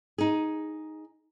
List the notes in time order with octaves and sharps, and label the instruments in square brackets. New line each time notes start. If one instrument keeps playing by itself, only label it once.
[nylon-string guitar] D#4 G#4